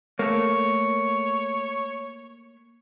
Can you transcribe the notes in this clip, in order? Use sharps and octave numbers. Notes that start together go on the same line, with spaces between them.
A3 A#3 C#5